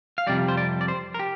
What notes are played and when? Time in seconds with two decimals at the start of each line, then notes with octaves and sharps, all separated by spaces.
0.18 F5
0.27 F2 C3 G3 D5
0.48 C5
0.57 D5
0.81 D5
0.88 C5
1.14 A#4
1.19 G4